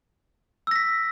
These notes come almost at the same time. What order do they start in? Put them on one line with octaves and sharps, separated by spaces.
E6 A#6 B6